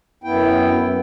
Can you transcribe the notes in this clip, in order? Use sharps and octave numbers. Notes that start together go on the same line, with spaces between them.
F#2 B3 E4 G5